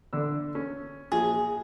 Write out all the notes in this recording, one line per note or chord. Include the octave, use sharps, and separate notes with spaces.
D3 D4 E6
C#4
A#1 F3 F#4 G#4